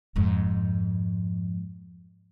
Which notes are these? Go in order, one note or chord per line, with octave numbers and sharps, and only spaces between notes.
F2 G#2